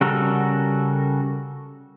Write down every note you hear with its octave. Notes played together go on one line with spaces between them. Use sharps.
C#3 G3 F#4 A4 A#4